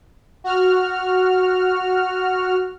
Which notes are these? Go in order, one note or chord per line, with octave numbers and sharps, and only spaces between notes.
F#4 F6